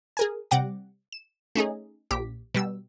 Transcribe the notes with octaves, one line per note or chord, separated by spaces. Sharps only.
G#4 A#4 G#5
C3 G3 F#5 G5 D6 A#6
E7
A3 C#4 D#4 G#4
A#1 G4 D6 B6
B2 G3 E6